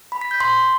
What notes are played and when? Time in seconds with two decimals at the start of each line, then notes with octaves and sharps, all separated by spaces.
0.12 B5
0.21 B6
0.31 G6
0.40 C6